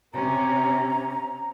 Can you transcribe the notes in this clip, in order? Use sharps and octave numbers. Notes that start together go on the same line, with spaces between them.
C3 C#4 A#5